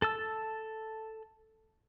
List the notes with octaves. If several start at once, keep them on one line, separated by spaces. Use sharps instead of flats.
A4 A5 E6